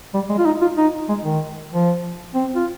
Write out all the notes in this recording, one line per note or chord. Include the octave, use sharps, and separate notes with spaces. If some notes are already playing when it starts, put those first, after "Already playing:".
G3
G#3
F4
D#4
F4
D#4
G#3
D#3
F3
C4
F4